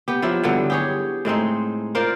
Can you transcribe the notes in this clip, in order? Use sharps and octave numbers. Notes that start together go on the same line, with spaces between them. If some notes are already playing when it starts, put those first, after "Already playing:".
B3 G4
F3 F#3 E4 G4
G2 D3 F#3 B3
G4 G#4 C#5
A2 G#3 C4 D#4
F4 A#4 C5 D5